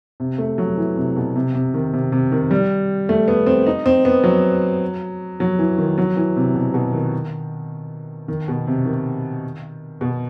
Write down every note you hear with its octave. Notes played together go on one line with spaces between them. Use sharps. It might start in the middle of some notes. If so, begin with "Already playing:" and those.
C3
A3
F#3
E3
C3
B2
C3
C3
D#3
C3
C3
D#3
G3
A3
B3
C4
D#4
C4
B3
F#3
F#3
E3
D#3
F#3
E3
C3
B2
B2
D#3
D#3
B2
C3
D#3
B2